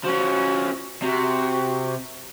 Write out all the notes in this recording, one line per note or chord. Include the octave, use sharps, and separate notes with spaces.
F3 C#4 F#4
C3 F#4